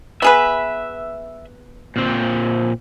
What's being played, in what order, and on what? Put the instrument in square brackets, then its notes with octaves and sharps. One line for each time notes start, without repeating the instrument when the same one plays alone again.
[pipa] B3 G#4 B4 [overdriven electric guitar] E5
[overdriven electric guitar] A#2 C4